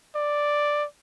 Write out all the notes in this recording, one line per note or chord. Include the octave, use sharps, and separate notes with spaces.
D5